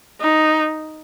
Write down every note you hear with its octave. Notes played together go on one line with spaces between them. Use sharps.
D#4